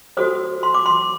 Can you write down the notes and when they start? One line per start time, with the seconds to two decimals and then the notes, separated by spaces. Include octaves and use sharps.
0.17 F#4 A4 C5 D#6
0.63 C6
0.74 D6
0.86 C6